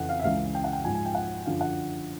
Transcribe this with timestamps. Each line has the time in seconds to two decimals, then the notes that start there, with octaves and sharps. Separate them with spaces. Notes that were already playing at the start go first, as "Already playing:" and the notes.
Already playing: F2 C#3 E3 F#5
0.09 F5
0.20 E5
0.24 C#2 C#3 E3 F5
0.55 G5
0.64 F#5
0.73 G5
0.85 G#2 F3 G#5
0.95 G#5
1.05 G5
1.15 F#5
1.46 F#2 D3 F3 F5
1.61 F#5